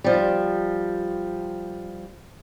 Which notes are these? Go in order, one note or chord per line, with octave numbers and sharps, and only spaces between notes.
F3 G3